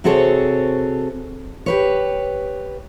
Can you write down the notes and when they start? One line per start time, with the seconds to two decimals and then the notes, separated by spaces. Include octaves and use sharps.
0.04 C3 C4 F#4 G#4 A4 C#5
1.66 G4 B4 C#5